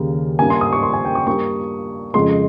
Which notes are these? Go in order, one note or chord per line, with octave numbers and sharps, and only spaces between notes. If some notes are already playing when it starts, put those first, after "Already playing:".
Already playing: D#2 C#3 G3 A#3
G2 G3 A#3 G#5
C6
D#6
C#6
C6
G#5
G5
C#6
G2 G3 A#3 C#6
F2 C#3 G#3 C6